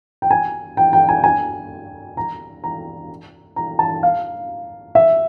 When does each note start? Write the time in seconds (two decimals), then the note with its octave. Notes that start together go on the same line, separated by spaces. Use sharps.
0.22 G5
0.31 G#5
0.77 G5
0.93 G5
1.09 G#5
1.24 G#5
2.17 A#5
2.64 A#5
3.56 A#5
3.79 A5
4.03 F5
4.95 E5